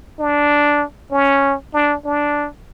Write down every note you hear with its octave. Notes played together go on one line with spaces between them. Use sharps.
D4
C#4
D4
D4